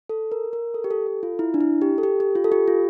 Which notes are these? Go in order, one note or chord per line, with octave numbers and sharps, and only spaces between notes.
A4
A#4
A#4
A4
G4
A4
A4
F4
E4
D4
E4
G4
A4
G4
G4
F4
A4
G4
F4